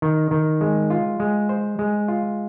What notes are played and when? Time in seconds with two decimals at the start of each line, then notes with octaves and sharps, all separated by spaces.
0.02 D#3
0.31 D#3
0.61 G#3
0.90 F4
1.20 G#3
1.49 C5
1.79 G#3
2.08 F4